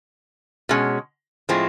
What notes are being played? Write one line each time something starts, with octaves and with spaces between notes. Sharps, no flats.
B2 G#3 C#4
A2 F3 G#3 C4